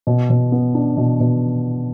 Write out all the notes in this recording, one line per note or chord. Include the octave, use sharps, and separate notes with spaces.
B2
B2
B3
D4
B2
B2